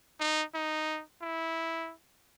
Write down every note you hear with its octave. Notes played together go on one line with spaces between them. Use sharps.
D#4
D#4
E4